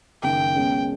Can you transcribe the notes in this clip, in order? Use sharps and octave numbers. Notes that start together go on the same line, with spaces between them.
F#1 F#2 D#3 G5
C#2 B2 G#3 C#4